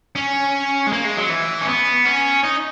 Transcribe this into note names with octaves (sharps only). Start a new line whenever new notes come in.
C#4
G#3
A#3
G#3
F#3
E3
C#4
B3
C#4
D#4